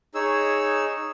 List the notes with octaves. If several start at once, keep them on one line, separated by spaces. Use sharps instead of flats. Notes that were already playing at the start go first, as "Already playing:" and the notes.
D#4 G#4 C#5 E6